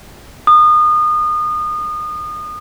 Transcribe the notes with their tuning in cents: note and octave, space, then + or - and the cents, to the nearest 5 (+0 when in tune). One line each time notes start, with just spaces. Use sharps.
D#6 -30